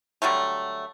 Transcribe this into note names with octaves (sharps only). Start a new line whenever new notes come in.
D3 F#3 G3 A3